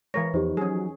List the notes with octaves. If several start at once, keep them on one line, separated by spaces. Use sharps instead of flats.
E3 G#3 A#4 C#5 A#6
E2 F3 D#4 G4 C5
F#3 C#4 G#4